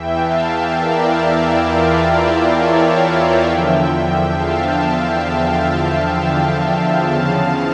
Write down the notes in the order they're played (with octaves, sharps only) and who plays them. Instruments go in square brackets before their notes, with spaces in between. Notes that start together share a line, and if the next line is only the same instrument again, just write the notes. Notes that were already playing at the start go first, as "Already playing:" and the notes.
Already playing: [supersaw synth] E2 E3 E5 G5
F5 A5
E5 G5
A#4 D5
E4
F4
A#4 D5
C#5 E5
D5 F5
E2 D3 F3 E5 G5
F5 A5
E2 C#3 F3 F5 A5